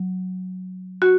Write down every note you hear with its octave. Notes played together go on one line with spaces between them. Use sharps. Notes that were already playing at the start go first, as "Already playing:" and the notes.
Already playing: F#3
F#4